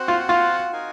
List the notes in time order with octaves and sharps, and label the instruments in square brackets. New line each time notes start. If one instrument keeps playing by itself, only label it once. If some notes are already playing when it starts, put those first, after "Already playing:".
Already playing: [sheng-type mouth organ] C4 F#4 C5 F#5
[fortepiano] F4
F4
[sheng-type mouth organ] D#4 F#4 A#4 F5 G#5